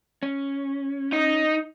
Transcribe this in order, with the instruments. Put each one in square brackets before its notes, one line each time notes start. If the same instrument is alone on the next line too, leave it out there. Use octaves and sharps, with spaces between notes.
[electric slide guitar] C#4
[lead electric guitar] D#4